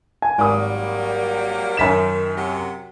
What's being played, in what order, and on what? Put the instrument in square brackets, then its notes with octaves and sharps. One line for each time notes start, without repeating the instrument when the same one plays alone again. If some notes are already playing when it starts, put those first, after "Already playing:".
[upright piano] G#5
[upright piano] G#1 D#6 [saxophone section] F#3 G3 A#3
[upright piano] F#2 B6 E7 [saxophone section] D#3
[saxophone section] C3 F#3